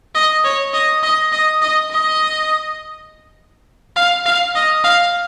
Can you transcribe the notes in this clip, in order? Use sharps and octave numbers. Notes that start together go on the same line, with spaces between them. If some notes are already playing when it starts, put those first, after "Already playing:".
D#5
C#5
D#5
D#5
D#5
D#5
D#5
F5
F5
D#5
F5